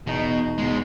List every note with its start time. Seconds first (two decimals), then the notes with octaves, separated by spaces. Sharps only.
0.07 E2 B2 D#4
0.58 B2 G#3